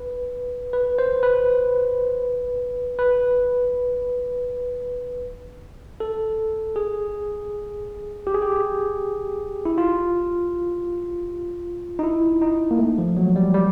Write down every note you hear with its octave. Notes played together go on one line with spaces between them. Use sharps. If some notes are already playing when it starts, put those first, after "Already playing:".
Already playing: B4
B4
C5
B4
B4
A4
G#4
G4
G#4
G4
E4
F4
D#4
E4
D#4
A#3
A3
F3
F#3
G3
G3